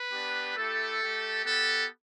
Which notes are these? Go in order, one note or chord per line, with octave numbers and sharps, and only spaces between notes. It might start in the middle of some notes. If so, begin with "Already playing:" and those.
Already playing: B4
B3 D4 G4
A3 E4 G4 A4
A3 G4
B3 G4 A4